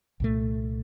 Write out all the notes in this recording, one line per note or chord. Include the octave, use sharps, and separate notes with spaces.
C2 A#2 A3